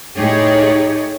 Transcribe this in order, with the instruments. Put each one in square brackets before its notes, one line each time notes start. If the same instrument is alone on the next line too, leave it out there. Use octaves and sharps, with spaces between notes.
[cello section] A2 A3 D#4 G4 G#4 C#5